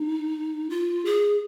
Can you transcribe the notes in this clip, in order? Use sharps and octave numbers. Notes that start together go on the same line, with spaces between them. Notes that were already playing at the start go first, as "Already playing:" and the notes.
Already playing: D#4
F4
G#4